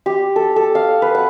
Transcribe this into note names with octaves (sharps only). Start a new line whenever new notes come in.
G4
A4
A4
F5
B4
F#5